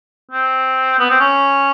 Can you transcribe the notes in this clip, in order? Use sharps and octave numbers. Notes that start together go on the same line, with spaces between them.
C4
B3
C4
C#4